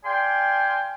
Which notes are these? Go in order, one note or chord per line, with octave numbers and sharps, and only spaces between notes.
D5 F5 G5 G#5 C6